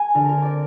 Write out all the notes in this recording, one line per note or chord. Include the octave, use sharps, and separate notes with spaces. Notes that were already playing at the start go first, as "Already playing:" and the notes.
Already playing: A#3 G#5
D3 A#4
A#4
C4
D5